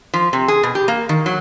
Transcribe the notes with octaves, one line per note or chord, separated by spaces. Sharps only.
F3
C3
G#4
B2
G4
A#3
D#3
F#3